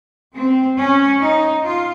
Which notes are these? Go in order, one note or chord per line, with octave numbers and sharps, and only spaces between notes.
C4
C#4
D#4
F4